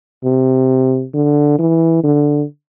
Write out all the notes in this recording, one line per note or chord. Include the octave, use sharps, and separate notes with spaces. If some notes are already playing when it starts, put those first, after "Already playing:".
C3
D3
E3
D3